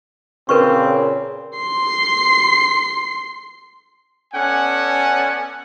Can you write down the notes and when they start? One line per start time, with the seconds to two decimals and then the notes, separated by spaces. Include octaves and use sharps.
0.49 A#2 C#3 C4 A#4 B4 C#6
1.58 C6 C7
4.34 B3 C#4 A4 D5 F#5 G#5